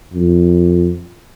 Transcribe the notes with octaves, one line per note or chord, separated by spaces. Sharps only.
F2